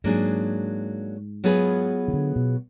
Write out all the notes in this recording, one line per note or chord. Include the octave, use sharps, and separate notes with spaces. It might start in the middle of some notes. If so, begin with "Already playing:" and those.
G#2 F#3 A#3 D4 G#4
F#3 B3 F4 G#4 B4
D#3
D3
B2